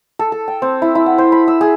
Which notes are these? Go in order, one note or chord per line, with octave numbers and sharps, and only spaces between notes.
A4
A4
G5
C4
E4
E4
F#5
C5
B5
E6
G#4